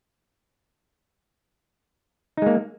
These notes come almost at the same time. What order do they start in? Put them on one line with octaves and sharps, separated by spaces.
D#4 G#3 A#3